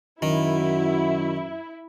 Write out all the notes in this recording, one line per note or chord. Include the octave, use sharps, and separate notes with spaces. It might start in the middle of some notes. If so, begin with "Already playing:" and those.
F#2 D#3 E4 F#4